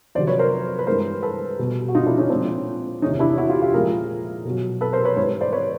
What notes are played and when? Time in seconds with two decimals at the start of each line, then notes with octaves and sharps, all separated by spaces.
0.15 F2 C3 D#3 F#3 C5 D5
0.27 B4 C#5
0.39 A#4 C5
0.79 B4
0.87 G2 E3 G#3 A#4 C5
1.22 A4 B4
1.59 B2 G3
1.88 F#4
1.95 D#4 F4
2.06 D4 E4
2.18 C#4 D#4
2.30 A#2 F3 G#3 C4 D4
3.02 E2 C3 D#3 C#4 D#4
3.19 D4 E4
3.37 E4 F#4
3.49 F4 G4
3.62 F4 G4
3.73 A#2 F3 G#3 G#4 A#4
4.45 B2 F#3
4.81 A4 B4
4.92 A#4 C5
5.05 B4 C#5
5.16 G#2 E3 G3 B4 C#5
5.41 C5 D5
5.52 B4 C#5